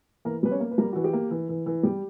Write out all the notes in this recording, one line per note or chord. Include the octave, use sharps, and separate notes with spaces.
E3 A#3 A#4
G3 B4
C#4 C#5
A#3
B4
G3 A#3 A#4
E3 F#4
G4
A#3
E3
E3
E3
G3 G4